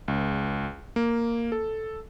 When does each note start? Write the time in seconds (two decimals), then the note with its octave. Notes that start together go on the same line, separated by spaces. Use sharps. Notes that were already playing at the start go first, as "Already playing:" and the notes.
0.08 C#2
0.96 A#3
1.52 A4